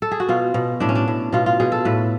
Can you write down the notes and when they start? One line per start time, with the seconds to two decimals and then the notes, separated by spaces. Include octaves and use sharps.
0.02 A4
0.11 G#4
0.20 F#4
0.29 B2 F4
0.54 B2
0.80 A2 D4
0.89 C#4
0.95 D4
1.08 A2
1.32 B2 F4
1.46 F4
1.60 B2 G#4
1.72 A4
1.85 A2 B4